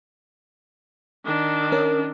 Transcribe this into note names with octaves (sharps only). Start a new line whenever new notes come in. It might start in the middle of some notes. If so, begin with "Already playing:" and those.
D#3 D4
C#4 A#4